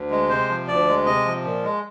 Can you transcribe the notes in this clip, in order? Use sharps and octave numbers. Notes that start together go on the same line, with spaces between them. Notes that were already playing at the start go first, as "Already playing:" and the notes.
Already playing: D2
G#3
C3 C5
F3
D2 D5
G#3
C3 D#5
F3
A#2
G#3